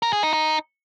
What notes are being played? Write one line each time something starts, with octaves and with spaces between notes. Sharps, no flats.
A#4
G#4
D#4
D#4